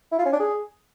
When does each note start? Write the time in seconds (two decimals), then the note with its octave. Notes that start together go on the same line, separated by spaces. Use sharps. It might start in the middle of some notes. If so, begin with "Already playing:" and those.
0.12 E4
0.19 F4
0.26 C#4
0.33 D4
0.40 G#4